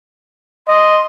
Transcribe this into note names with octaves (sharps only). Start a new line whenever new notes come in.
D#5 C6